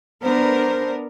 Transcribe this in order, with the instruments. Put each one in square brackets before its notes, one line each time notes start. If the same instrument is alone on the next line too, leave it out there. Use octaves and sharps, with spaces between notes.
[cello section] B3 D4 A#4 [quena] C5